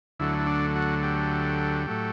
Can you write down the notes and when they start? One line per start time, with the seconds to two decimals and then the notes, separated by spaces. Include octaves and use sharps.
0.20 D2 D3 F#3 A3 E4
0.39 E4
0.47 D4
0.75 F#4
1.03 G4
1.87 A2 F#3 A3